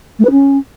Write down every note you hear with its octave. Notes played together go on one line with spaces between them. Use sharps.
A3
B4
C#4